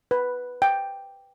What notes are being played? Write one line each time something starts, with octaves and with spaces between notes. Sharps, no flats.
B4
G5